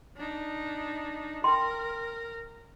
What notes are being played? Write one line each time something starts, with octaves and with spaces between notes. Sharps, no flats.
D4 D#4
A#4 G5 C6